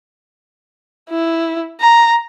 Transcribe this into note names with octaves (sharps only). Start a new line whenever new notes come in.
E4
A#5